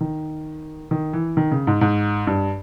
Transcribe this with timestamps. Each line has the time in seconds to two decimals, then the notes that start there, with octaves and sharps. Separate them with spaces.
0.01 D#3
0.91 D#3
1.13 E3
1.37 D#3
1.51 C#3
1.67 G#2
1.81 G#2
2.27 G2